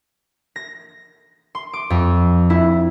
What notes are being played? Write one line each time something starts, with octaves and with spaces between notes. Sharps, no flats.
A#6
C6
D6
F2
E4